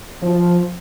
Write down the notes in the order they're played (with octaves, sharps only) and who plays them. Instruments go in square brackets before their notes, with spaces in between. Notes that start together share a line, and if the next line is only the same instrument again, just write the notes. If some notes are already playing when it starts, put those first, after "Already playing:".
[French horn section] F3